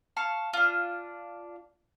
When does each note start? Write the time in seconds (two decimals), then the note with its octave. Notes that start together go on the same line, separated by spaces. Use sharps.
0.17 F5 A5 C#6
0.53 D4 F4